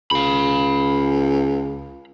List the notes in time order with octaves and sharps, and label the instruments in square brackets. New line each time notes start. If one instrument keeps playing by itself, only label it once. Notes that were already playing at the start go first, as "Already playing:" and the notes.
[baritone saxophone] C#2 [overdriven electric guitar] F5 B5